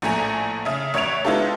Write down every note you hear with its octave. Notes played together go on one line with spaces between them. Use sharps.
A#1 A2 A3 G#5 A#5
C#3 E5
A1 C#5 E5 G#6 D7 F7
G#3 B3 E4 F4 G4 A4